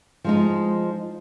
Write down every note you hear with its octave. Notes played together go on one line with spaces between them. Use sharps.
F3 G#3 D#4